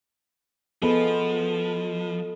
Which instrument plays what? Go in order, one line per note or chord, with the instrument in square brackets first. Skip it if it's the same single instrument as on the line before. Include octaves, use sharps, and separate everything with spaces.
[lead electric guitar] F3 [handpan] B3 G#4 [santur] A4 B4 D#5